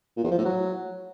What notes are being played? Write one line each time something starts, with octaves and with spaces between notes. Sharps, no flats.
A#2
E2
F3
A2
F#3